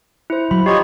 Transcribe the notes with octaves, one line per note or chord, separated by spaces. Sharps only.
E4 C5
F#3 B5
D#4 F4 G4 C#5